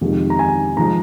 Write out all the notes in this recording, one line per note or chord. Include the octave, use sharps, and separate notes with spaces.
F2 C3 D#3 G#3
A#5
G#5
G#2 F3 G#3 A#5